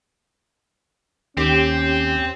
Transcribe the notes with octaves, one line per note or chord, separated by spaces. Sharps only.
D#2 C4 C#4 G4